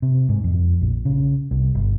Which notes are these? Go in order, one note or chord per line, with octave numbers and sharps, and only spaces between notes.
C3
G#2
F2
A#1
C#3
C2
G1